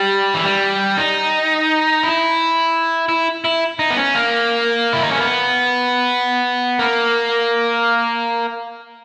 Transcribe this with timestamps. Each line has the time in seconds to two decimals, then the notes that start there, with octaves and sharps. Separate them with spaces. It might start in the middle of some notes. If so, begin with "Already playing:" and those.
Already playing: G3
0.35 E3
0.44 G3
0.97 D#4
2.03 E4
3.09 E4
3.44 E4
3.79 D#4
3.90 B3
3.97 C#4
4.15 A#3
4.93 E4
5.03 D#4
5.11 C#4
5.20 B3
6.79 A#3